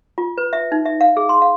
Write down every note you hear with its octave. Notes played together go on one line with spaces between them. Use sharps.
F4
B4
E5
D#4
E5
F5
G#4
C6
F5